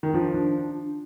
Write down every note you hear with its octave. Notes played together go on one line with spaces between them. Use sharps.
D#3
F3 D4
D4